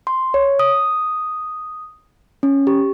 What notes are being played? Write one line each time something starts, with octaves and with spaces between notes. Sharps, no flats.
C6
C#5
D#6
C#4
G4